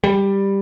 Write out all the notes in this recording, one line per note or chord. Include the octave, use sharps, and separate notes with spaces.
G3